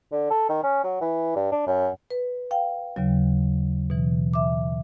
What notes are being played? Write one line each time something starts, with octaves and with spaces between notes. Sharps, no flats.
D3
A4
D#3
C#4
F#3
E3
G2
D4
F#2
B4
F5 G5
D#2 C#3 F#3
B2 E3
E5 D6